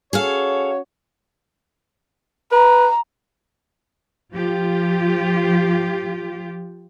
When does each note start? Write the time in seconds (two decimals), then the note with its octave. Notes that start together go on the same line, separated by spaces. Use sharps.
0.13 C#4 F#4 G#4 A4 C#5 F5
2.52 B4 A#5
4.33 F3 F4 G4